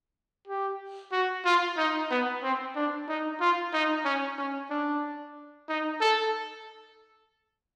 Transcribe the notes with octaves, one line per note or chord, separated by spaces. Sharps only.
G4
F#4
F4
D#4
B3
C4
D4
D#4
F4
D#4
C#4
C#4
D4
D#4
A4